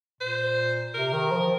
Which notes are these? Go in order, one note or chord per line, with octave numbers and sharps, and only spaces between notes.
A#2 C5
C3 A#4
D#3
F3